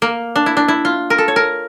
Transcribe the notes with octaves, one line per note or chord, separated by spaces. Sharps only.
A#3
D4
E4
D4
E4
F4
A#4
A4
C#5
A#4